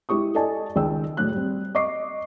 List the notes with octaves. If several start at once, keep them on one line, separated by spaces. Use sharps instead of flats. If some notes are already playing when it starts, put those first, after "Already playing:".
G#3 E4 G4 C#6 D#6
A4 D5 D#5 G#5 A5
C#2 D#3 G5 E6
A2 F#3 F#6
G3 C4
D#5 C#6 D6 C7